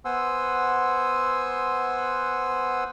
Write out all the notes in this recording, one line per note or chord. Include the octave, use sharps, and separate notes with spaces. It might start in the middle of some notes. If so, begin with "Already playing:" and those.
B3 C5 F#5 G#5 C6 E6